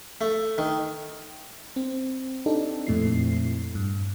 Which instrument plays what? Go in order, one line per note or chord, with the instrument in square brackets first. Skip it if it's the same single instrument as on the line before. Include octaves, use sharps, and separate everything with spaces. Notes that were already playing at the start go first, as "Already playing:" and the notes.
[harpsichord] A3
D#3
[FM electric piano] C4
C4 D4 D#4 G4 A4
F2 A#2 A3 C4 E4 C7
G2